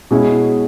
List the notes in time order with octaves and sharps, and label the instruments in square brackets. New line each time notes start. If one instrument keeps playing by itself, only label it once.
[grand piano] B2 G#3 C#4 E4 G#4